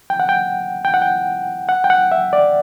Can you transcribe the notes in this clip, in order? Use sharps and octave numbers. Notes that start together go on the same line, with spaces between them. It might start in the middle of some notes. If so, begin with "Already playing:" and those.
G5
F#5
G5
G5
F#5
G5
F#5
G5
F#5
E5
D5